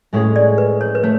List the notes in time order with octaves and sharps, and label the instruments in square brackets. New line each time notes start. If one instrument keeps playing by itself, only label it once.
[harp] A2 G#3 C#4 G#4
[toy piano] D5
B4
C#5
B4
[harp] A3 [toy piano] C#5